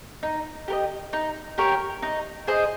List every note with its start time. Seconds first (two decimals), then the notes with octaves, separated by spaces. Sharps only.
0.23 D#4
0.68 G4 A#4
0.72 D#5
1.13 D#4
1.58 G4 A#4 C#5
2.02 D#4
2.47 G#4 C5 D#5